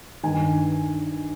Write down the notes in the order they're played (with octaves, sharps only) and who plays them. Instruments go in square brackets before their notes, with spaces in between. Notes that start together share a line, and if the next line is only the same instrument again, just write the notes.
[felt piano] G2 D#3 G#5